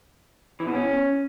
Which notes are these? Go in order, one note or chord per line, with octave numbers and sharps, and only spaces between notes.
E3
B2
C#4